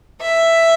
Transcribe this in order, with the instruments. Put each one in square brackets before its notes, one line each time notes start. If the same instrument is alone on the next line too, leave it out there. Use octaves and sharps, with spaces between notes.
[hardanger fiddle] E5